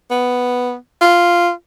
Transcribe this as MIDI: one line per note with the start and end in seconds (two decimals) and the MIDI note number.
0.11 0.75 59
1.01 1.50 65